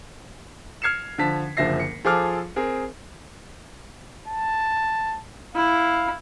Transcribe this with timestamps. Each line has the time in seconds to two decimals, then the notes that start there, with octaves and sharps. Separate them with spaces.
0.82 F6 G#6 C7 C#7 E7
1.18 D3 F3 A5 B6
1.57 F#1 D3 F3 E5 A#6 C7
1.80 C#7
2.05 F3 F4 G#4 A4 D6 F6
2.56 C4 G#4 A#4
4.28 A5
5.56 E4 F5